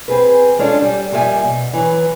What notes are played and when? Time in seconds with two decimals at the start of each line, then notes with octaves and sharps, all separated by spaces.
0.08 C4 G#4 B4
0.59 G#3 C#4 D4 E4 F4 A4
0.82 G3
1.11 F2 A#2 G3 A4 E5 G#5
1.43 B2
1.73 E3 F#3